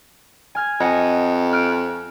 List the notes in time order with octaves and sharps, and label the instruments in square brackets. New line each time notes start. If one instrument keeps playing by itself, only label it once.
[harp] G#5 F6 G#6
[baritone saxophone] F2 [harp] D#5 F#5 G#5
[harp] F6 F#6 D7